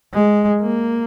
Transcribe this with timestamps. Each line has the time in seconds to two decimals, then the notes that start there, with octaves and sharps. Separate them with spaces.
0.14 G#3
0.61 A#3